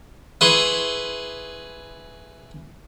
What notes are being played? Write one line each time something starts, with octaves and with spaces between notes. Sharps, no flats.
E4 G#4 B4 G#5 C6 C#6